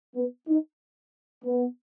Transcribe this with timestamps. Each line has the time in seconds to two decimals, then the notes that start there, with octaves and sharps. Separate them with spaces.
0.16 B3
0.48 D#4
1.45 B3